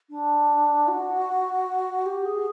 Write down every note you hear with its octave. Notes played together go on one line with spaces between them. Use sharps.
D4
F#4
G4
G#4